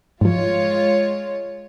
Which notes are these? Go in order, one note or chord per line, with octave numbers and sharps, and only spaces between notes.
G#2 F3 G#3 F4 C#5